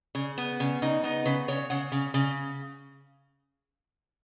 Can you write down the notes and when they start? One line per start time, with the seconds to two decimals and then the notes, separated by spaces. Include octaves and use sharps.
0.15 C#3
0.38 B3
0.60 C#3
0.82 C#3 D#4
1.04 B3 D#4
1.25 C#3 B4
1.48 C#3 C#5
1.70 C#3 F#5
1.92 C#3
2.14 C#3